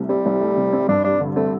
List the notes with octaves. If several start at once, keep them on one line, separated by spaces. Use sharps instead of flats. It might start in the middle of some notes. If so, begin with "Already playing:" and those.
Already playing: C2 C3 A3
G3 C4
C2
A3
C3
C4
G2 D4
G3 D4
D3
A3 C4